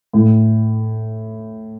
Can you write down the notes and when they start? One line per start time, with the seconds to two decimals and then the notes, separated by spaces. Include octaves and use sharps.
0.13 A2